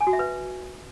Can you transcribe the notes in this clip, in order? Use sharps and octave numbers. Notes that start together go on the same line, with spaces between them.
G#5
F#4
E5
B4